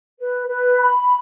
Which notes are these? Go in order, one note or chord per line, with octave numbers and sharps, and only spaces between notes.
B4
B4
B5